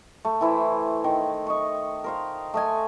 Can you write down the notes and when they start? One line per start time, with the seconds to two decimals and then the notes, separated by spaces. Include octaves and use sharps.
0.25 A3
0.41 E3 E4 C5
1.04 D#3
1.47 D#5 C#6
2.04 A#4 C5 F5
2.54 A3 D#5 G#5